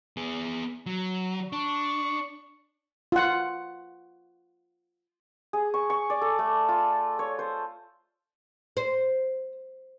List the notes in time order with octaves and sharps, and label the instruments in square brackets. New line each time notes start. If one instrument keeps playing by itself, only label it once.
[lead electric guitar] B3 G#4
F#3
[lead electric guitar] D4 [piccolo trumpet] C#6
[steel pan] F4 F#5
[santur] G#4
C#6
C#6
D5
A4
A3
F4
C#5
C5
[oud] C5